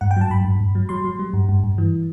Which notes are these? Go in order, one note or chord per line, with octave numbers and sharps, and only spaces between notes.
G2 F#5
G5
F#3 A5
G2 B5
G2
G2
F#3
F#3 C6
F#3
G3
G2
G2
G2
E3